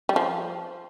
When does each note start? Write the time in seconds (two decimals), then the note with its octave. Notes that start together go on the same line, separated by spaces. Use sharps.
0.09 G3
0.16 F3